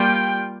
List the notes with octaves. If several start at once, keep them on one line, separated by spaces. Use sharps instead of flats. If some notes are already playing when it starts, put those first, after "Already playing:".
Already playing: G3 A#3 F4 G5